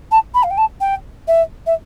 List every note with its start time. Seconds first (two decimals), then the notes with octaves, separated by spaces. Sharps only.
0.11 A5
0.34 B5
0.43 F5
0.51 G5
0.58 A5
0.81 G5
1.28 E5
1.66 E5